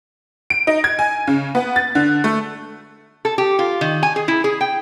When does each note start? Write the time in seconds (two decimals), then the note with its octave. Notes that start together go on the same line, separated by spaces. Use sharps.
0.50 D7
0.67 D#4
0.84 G#6
0.99 G#5
1.27 C#3
1.55 B3
1.76 A6
1.95 D3
2.24 A3
3.25 A4
3.38 G4
3.59 F4
3.81 D#3
4.03 G#5
4.16 G#4
4.28 E4
4.44 G#4
4.61 G5